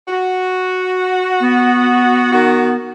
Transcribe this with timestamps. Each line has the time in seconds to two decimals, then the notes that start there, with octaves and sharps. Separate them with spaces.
0.08 F#4
1.40 B3
2.32 D#3 F#4